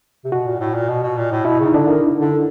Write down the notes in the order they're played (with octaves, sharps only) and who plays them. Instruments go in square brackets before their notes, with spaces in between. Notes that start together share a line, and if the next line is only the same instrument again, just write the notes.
[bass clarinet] C3
[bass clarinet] B2 [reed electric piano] F#4
[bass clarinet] A#2
A2
A#2
B2
B2
A#2
A2
[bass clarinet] B2 [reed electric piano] E4
[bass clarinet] C#3
[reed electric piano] D#4
[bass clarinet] D3 [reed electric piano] D4
[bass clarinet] D#3
D3